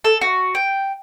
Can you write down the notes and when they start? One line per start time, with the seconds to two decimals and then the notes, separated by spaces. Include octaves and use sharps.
0.04 A4
0.21 F#4
0.55 G5